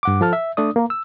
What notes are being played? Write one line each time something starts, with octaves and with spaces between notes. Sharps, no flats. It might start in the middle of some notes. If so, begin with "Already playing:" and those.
G2 F#5 D6
F3 A4 A5 F6
E5
A3 D4 D5 D#6
A#3 A#4
E6